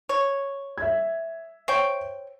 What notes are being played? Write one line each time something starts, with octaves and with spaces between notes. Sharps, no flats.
C#5
E5 G#6
C5 C#5 G5